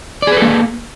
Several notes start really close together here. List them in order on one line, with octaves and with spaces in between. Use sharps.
D5 G#4 B4 A4 A#3